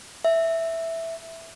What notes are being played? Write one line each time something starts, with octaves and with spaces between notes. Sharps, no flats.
E5